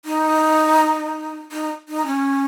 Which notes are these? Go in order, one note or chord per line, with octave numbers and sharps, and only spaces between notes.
D#4
D#4
D#4
C#4